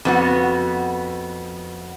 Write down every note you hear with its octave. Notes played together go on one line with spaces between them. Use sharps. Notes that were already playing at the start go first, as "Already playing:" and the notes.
F2 B3 F#4